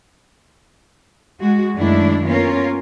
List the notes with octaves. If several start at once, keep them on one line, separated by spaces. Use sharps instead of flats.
G#3 F#4
F#2 D#3 G#3 A3 D4 E4
A#3 B3 C#4 F4 A#4